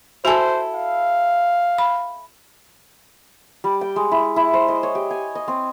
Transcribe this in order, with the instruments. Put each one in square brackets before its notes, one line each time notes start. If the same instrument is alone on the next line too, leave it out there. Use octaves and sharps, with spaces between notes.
[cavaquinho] E4 A4 [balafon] F#4 G#5 [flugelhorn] C5
[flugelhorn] F5
[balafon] B5
[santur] G3
G5
G#3
E4
E4
C5
D#5
C#5
G4
G#5
D#5
C4